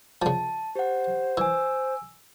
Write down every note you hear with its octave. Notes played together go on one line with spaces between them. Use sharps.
C#3 F3 A5
G4 C5 F#5
E3 G#5 E6